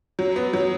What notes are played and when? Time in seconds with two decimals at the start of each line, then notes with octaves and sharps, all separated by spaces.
0.19 F#3
0.36 B3
0.53 F#3